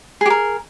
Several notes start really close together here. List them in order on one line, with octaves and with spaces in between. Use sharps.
G#4 G4 A#4